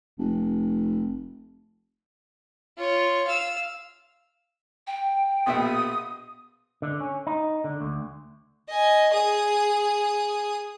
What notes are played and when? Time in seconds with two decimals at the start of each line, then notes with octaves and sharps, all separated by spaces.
0.19 F1
2.77 F4 C#5
3.27 F5 E6
4.87 G5
5.46 A#1 B2 E5 D#6
6.82 D3
7.01 C#4
7.27 D#4
7.64 D3
7.80 D2
8.68 D#5 G#5
9.13 G#4 D#6